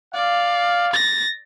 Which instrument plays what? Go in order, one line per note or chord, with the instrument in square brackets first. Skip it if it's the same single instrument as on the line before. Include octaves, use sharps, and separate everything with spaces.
[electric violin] D5 [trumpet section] F5
[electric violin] A6 A#6